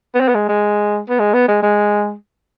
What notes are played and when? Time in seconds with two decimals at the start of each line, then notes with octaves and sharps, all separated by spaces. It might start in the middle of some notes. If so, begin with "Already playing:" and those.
0.15 B3
0.20 C4
0.28 B3
0.35 G#3
0.49 G#3
1.09 B3
1.19 G#3
1.34 B3
1.48 G#3
1.62 G#3